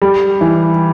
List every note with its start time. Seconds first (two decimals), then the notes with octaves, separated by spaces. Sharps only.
0.02 G3
0.41 E3